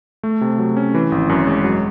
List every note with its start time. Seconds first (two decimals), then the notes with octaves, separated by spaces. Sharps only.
0.23 A3
0.41 C3
0.58 F#3
0.77 C#4
0.94 E3
1.12 G#1
1.29 F#2
1.47 G#3
1.64 F#3